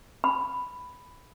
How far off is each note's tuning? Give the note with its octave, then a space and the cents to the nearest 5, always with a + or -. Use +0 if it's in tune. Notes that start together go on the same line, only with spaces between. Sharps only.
B5 +5